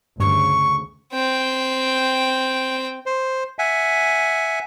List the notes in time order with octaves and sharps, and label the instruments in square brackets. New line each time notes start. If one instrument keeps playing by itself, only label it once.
[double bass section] D2 C#3 [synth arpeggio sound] G2 [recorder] C#6
[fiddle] C4 G5
[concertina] C5
E5 F#5 G#5